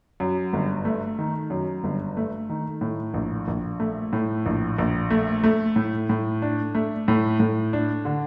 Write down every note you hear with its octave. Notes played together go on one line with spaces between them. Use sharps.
F#2
G1
A3
D#3
F#2
G1
A3
D#3
A2
A#1
A#1
A3
A2
A#1
A#1
A3
A3
A2
A2
D4
A3
A2
A2
D4
D3